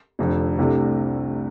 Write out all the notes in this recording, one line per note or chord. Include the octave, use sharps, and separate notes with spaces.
F1 F2 D3
C2 C3 A3 D4